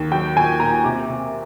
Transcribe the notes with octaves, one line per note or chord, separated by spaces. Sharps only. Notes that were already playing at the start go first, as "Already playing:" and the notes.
Already playing: D#2
F#3 G5
A#2 G#5
A#2 A#5
C3 D6
C3